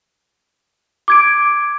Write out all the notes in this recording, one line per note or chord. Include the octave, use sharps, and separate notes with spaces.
D6 G#6 D7